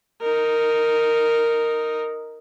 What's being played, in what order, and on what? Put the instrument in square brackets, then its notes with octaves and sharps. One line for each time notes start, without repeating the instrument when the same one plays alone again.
[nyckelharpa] D#4 A#4